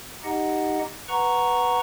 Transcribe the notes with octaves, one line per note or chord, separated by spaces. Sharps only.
D#4 G4 D#5 F#5
B4 F#5 A#5 C#6